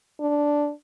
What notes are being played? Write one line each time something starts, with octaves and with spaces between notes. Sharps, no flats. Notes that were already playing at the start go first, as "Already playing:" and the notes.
D4